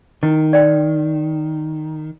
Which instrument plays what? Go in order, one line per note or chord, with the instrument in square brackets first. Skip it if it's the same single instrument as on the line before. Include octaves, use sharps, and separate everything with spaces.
[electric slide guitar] D#3 [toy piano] E4
[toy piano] D5 G5